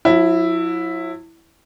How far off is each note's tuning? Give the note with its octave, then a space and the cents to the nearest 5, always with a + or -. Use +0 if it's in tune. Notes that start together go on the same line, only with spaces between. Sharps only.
F#3 -45 E4 +0